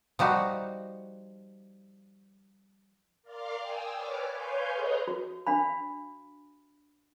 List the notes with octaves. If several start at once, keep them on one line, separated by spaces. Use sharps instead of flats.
F3 G3 D#4 F#4
A#4 D5 F5 C6 D6 F6
G5 G#5 D#6 E6
B4 C#5 D5 D6 F6
B4 C#5 F5 G#5 C6 G6
G#4 A4 B4 D#5 A#5 B5
F#4
D4 F5 B5